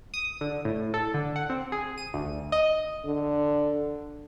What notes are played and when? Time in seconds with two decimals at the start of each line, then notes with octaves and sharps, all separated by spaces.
0.14 D#6
0.41 D3
0.65 A2
0.94 A4
1.14 D3
1.36 F#5
1.50 C4
1.72 G#4
1.98 D#7
2.14 D2
2.52 D#5
3.05 D3